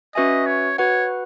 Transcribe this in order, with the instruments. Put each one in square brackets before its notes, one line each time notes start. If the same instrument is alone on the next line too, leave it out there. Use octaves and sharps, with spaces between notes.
[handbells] C#4 F#4 B4 E5 G#5 [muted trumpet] D#5
[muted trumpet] C#5
[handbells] F#4 B4 F#5 [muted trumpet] C#5